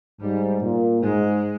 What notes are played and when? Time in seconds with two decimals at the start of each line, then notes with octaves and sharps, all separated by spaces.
0.20 G#2 G3
0.62 A#2
1.02 G#2 G#3